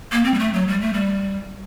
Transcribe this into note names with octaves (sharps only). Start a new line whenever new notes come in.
A#3
C4
G3
A3
F#3
G3
A3
G3